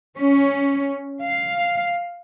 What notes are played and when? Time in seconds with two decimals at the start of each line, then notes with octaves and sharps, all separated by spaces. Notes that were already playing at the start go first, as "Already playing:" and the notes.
0.17 C#4
1.22 F5